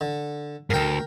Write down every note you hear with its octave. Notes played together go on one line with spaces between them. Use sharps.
D3
D2 G#2 A#4 G5